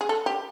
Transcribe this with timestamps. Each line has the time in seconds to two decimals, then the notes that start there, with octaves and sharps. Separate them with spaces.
0.01 G#4
0.09 A4
0.26 G4